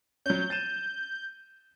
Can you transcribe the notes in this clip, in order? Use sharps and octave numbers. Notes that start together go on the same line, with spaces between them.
F#3 C#4 G6
A6 D#7 E7